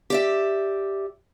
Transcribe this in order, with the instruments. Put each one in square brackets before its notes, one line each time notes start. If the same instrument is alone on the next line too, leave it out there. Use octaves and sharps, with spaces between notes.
[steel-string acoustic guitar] G4 D5 E5